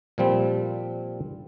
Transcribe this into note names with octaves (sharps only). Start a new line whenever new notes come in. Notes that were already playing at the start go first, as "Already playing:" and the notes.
A#2 F3 G3 C4